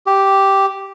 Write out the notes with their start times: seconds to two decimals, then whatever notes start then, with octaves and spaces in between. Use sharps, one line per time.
0.07 G4